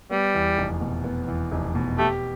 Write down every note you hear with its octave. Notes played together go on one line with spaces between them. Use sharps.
G3 B3
E2
F1
B2
B3
E2
F1
B2
A3 G4